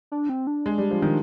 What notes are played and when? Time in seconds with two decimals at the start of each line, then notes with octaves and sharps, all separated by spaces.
0.12 D4
0.29 C4
0.47 D4
0.66 G#3
0.78 G3
0.91 F3
1.02 D#3